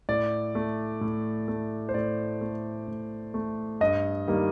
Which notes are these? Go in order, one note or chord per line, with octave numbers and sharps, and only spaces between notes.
A2 D5
A3
A2
A3
C5
A2 D5
A3
A2
A3
G2 D#5
D#3 G3 A#3